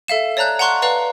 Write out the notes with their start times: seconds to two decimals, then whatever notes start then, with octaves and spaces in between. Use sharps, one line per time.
0.08 A4 E5 F5 E7
0.37 C#5 D5 A5 A#5 F#6 G6
0.59 F#5 A5 A#5 C6 C#6 F#6
0.82 B4 D5 F5 A#5